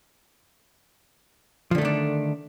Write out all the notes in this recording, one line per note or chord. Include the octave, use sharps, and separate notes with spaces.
D3 D#3 F3 A3 D4